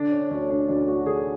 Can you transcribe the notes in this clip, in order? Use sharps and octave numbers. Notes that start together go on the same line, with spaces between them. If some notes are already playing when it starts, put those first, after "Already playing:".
Already playing: D3 D4
C#4
D2 C#4
D4
D2 D4
F#4
D3 G#4